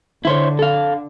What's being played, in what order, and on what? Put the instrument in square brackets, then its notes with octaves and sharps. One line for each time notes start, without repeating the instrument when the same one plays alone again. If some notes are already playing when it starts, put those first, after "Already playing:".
[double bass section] D3 [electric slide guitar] E4 C5 C#5
[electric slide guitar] A4 F5